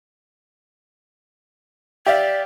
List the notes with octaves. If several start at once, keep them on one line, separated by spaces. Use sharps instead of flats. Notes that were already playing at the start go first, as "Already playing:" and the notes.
G4 D5 E5 F5